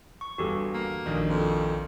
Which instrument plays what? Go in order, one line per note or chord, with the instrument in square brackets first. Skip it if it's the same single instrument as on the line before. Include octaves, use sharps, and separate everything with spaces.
[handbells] C#6
[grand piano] G1 E2 [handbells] F#4 G4 A4
[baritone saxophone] A#3
[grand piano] A#1 D#3
[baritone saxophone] F2